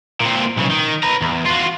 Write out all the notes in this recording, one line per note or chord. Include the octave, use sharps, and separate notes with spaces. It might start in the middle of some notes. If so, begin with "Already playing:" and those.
A#2 C4
B1 C#3
D#3
B4 A#5
E2
F4 F#4